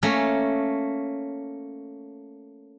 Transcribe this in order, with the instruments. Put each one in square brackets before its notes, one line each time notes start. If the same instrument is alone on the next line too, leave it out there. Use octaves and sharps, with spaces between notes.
[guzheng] A3 A#3 C#4